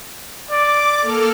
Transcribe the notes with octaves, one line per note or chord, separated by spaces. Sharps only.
D5 D6
A#3 A4 F6